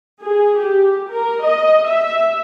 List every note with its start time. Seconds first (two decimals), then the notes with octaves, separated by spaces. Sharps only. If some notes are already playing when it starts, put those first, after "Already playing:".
0.23 G#4
0.59 G4
1.10 A#4
1.44 D#5
1.87 E5